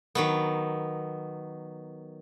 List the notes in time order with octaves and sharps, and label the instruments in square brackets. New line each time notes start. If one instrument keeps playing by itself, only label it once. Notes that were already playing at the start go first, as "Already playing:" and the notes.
[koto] D#3 F#3 B3